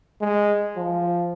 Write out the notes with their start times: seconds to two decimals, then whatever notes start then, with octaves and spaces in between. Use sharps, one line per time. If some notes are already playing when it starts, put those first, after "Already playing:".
0.21 G#3
0.77 F3